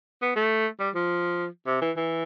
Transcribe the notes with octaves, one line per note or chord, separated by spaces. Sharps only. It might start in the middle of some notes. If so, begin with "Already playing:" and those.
B3
A3
G3
F3
C3
E3
E3